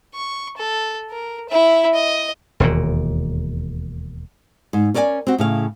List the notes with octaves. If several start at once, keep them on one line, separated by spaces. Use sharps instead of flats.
C#6
A4
A#4
E4 E5
D#5
E1 D#2 A#2
G#2
C#4 A#4 D5 E5 G#5
C4 F#4
A2 C#3 F5